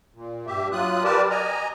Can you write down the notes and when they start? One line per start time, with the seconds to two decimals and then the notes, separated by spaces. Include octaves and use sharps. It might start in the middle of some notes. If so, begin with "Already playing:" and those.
0.14 A#2
0.47 G2 G4 E5
0.72 F#3 F4 D#6 F#6
1.04 G4 A#4 B4 D5 A5
1.30 D#5 G#5 A#5